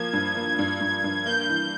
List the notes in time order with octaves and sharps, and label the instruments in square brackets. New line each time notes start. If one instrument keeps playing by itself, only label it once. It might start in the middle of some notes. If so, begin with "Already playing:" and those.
Already playing: [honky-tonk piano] F3 A#3 [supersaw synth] G#6
[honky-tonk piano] G2
A#3
G2
G2
G2
[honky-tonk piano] A#3 [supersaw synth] G6
[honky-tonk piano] E3